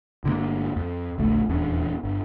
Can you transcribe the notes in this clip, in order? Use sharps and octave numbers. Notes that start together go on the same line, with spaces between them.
G1 D3 D#3 A#3
F2
D#1 A#1 D3 A3
D#1 E2 C#4 D4
G1